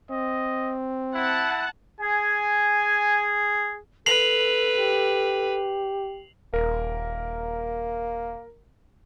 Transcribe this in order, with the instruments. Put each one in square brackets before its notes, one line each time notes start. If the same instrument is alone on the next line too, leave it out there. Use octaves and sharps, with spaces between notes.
[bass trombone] C4 [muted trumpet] D#5
[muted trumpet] E4 [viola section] F#5 A5
[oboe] G#4 [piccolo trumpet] G#5
[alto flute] A4 [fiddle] B4 [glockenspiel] C7 F7 F#7
[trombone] G4
[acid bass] D#1 [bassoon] A#3 [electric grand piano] A#4